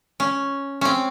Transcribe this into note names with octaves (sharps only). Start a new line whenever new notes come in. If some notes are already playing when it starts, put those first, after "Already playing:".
C#4
C4 C#4